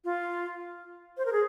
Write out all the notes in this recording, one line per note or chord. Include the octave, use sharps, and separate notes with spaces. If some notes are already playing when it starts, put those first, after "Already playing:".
F4
C5
A#4
G#4